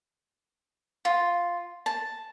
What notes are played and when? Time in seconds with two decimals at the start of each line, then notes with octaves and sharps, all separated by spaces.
1.05 F4
1.86 A5